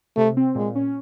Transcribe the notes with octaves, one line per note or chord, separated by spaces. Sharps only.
C3 A3
C4
A#2 G#3
C#4